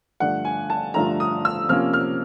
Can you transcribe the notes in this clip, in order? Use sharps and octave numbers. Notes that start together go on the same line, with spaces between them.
G2 D3 F3 A3 D4 F#5
G#5
A5
G2 D3 F3 A3 D4 A#5
D#6
E6
C3 F3 A#3 C#4 F6
F6